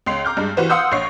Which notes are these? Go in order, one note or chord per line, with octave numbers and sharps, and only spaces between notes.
C#2 C#4 C6 C7 F7
A#5 D6 F6 G6
G2 G#3
E3 F#4 G4 B4 C5
F5 F#5 C6 D#6 E6 G6
A#1 C#5 C7